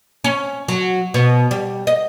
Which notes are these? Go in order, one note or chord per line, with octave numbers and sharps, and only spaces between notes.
C#4
F#3
B2
G3
D#5